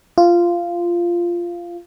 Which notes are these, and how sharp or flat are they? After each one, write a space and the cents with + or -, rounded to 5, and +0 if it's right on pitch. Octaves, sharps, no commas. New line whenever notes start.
F4 -10